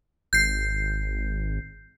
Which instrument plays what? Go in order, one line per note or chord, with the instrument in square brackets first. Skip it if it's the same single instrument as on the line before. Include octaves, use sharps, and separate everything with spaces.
[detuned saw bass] G#1 [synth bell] G6 C7